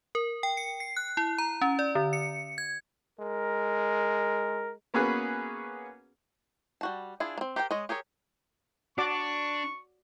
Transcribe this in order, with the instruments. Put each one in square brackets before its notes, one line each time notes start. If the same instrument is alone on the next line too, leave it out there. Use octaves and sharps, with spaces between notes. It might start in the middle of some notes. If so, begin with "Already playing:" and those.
[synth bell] A#4
G5
C#7
C7
F#6
E4
A#5
C#4
D5
D3
C#7
G#6
[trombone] G#3 [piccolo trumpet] A#4
[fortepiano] A#3 B3 C#4 F#4 G#4 B4
[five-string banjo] G3 F#4 A5
D4 E4 F4 G#4
A#3 C4
G4 A#4 C5 C#5 G5
G#3 C#5 D#5
G4 G#4 A#4 C#5
[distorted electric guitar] D4 [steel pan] F#4 D5 D6 [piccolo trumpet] C#6